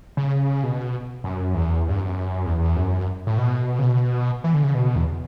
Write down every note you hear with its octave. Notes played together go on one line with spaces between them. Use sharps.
C#3
B2
F#2
E2
G2
F#2
E2
F#2
A2
B2
C#3
B2
E3
D3
C#3
B2
E2